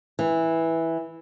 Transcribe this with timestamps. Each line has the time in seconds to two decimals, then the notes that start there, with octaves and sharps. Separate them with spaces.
0.19 E3